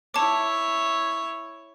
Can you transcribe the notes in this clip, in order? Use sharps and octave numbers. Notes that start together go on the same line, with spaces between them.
E4 C#5 A5 D6